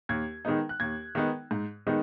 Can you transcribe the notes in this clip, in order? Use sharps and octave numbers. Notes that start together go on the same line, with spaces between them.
D#2 G#6
D#3 G#3 B3 D#4
F#6
D#2 G#6
D#3 G#3 B3 D#4
G#2
D#3 G#3 B3 D#4